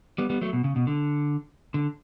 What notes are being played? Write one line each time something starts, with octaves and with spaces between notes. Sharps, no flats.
G3 B3
G3 B3
F#3 A3
B2
C#3
B2
D3
D3